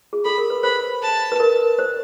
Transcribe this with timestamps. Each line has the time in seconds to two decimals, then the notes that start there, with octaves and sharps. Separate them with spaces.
0.13 G#4
0.25 A4 B5
0.38 A#4
0.50 B4
0.63 C5 B5
1.02 A5
1.32 B4
1.40 A#4
1.79 C5